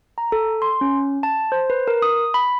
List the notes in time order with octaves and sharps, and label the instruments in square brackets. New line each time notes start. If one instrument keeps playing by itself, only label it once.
[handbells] A#5
A4
C6
C#4
A5
C5
B4
A#4
D#6
B5